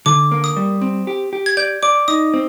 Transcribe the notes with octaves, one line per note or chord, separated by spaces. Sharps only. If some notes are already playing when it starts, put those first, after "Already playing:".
D3 D6
A#3
D#6
G3
C4
G4
G4
G#6
D5 G6
D5 D6
D#4 D#6
C4